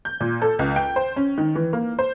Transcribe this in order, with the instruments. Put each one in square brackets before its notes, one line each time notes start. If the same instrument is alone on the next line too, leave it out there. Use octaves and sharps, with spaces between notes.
[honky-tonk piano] G6
A#2
A4
C#2
G5
C5
C#4
D#3
E3
A#3
C5